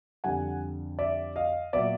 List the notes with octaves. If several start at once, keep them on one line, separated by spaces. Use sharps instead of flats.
F2 D3 G3 F#5 G#5
D5 E5
D#5 F5
A#2 F#3 B3 D5 E5